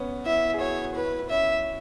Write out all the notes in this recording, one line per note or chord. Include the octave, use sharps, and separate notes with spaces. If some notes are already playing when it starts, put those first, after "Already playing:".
Already playing: B3 C#4
E4 E5
G#4
F#4 C#5
E4 B4
E4
C#4 E5